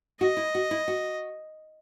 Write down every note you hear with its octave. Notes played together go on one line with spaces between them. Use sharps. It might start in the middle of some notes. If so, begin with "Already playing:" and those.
F#4 D#5
E4
F#4
E4
F#4